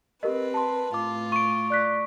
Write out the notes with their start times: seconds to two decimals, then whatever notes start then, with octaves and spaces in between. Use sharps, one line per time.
0.23 C4 G4 A#4 B4 D#5
0.54 A5 C6
0.94 A2 F4 D6
1.32 C#6 D7 D#7
1.70 D5 F#6 B6